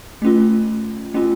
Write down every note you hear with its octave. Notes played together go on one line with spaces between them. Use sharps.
A3 C#4 F4
A3 C#4 F4